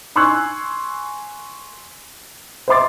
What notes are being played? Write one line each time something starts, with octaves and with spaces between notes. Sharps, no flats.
G#5 C6 C#6 E6 F#6 G#6
C5 D#5 E5 C6 D6 A6